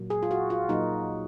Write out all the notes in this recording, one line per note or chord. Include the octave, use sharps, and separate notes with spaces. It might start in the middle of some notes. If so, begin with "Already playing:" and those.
Already playing: A#2 F#3 A#3
G#4
F4
F#4
F4
A#2 F#3 A#3 D#4